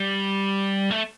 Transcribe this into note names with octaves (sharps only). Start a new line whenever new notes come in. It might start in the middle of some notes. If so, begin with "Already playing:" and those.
Already playing: G3
A3